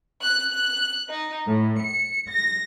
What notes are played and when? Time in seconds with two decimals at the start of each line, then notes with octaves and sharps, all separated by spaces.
0.22 F#6
0.51 F#6
1.09 D#4
1.46 A2
1.81 C#7
2.29 A#6